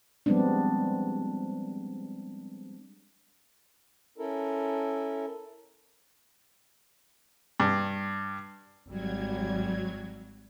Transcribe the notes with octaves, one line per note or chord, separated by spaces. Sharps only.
F3 G3 G#3 B3 C4 D4
C#4 E4 A4 A#4
G2
G#1 F#3 G3 G#6